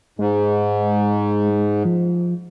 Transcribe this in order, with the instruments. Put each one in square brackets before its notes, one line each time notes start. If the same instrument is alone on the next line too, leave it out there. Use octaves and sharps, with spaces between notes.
[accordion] G#2 [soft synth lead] G#3
[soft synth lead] F3